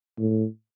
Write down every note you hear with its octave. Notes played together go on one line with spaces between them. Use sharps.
A2